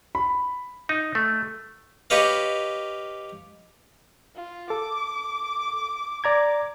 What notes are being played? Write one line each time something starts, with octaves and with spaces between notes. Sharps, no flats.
B5
D#4
A3
G4 B4 C#5 D#5 F5
F4
A4 D6
D5 A#5 G#6